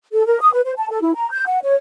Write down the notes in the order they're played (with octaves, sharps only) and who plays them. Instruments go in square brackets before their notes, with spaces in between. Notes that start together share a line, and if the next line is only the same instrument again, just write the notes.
[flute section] A4
A#4
D#6
B4
C5
A5
A4
E4
A#5
G6
F#5
C#5